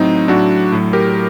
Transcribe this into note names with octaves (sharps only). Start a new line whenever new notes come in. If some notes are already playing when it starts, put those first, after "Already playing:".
Already playing: A2 F#3 C4 D#4
A2 F#3 D4 F#4
A2 F#3
G4 A#4